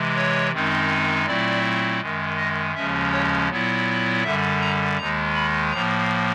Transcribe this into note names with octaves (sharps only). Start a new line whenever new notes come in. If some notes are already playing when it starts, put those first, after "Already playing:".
Already playing: C3 E3 G#3
C#5
F#2 D#3 G#3 C4 D#4
A#2 F#3 A3 C4 E4 D5
F#2 D#3 G#3
D#5
D#2 C#3 F3 G#3 C#4 E5
C#5
A#2 F#3 B3 E4
F#2 D3 G3 E5
A#5
D#2 D#3 G#3 A#5
B5
A2 F3 A#3 A#5